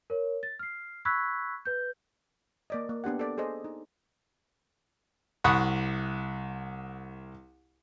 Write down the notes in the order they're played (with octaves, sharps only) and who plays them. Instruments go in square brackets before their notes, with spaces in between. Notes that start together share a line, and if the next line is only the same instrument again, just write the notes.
[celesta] A#4 C#5
A6
F6 C7
B5 C#6 E6 F#6 G#6 B6
B4 G6
[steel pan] A#3 D5 D#5
A#3
B3 D4 G4 F#5
A4 D5
G#4 A4 C5 D#5
D#4
[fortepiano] C2 F#5 B5 C#6 D#6